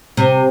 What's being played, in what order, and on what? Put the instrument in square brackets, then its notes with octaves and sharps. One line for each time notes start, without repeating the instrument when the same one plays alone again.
[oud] C3